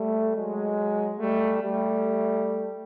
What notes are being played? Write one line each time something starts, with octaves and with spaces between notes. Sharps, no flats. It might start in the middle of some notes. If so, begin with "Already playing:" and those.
Already playing: G3 A3
F#3 G#3
G3 A3
G3 A3